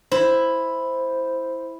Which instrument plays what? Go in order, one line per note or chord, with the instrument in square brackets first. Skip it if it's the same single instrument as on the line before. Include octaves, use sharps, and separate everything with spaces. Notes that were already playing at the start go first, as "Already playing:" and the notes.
[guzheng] E4 [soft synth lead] C5